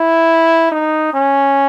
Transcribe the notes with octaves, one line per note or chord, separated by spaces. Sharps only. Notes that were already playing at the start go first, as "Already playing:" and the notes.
Already playing: E4
D#4
C#4